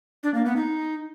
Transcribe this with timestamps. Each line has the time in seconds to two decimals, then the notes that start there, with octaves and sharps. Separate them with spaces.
0.23 D4
0.34 A#3
0.45 B3
0.56 D#4